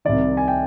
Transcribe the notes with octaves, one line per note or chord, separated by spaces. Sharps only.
C2 C3 D#3 D5
G#5
G5